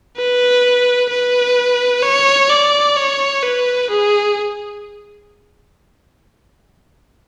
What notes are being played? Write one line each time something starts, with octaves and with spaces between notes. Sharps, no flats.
B4
B4
C#5
D5
C#5
B4
G#4